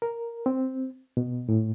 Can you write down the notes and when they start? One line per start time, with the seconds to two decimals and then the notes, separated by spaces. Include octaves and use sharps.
0.02 A#4
0.46 C4
1.17 B2
1.49 A2